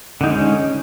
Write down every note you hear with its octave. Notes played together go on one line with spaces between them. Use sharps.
D3 G#3 C#4 D#4